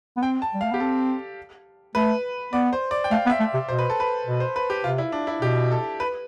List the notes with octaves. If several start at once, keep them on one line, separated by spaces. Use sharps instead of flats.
B3
C4 G5
A5
G3
A3 F5
B3 G4
C4 A4
A3 B4
B3 D5
C5
D5
G5
A3 F5
B3
E5
A3
C3
B2 C5
B4
A4
B4
B2
C5
B4
G4
C3 F4
E4
D4
E4
B2 G4
A4
B4